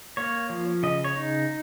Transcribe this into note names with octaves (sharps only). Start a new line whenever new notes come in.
A#3 C#5
F3
C#3 D#5
C#5
D#4